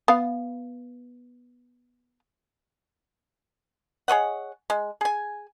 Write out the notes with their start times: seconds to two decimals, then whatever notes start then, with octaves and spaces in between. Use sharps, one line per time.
0.08 B3 F5
4.08 G#4 C#5 D#5 F#5
4.70 G#3
5.01 G#4 G#5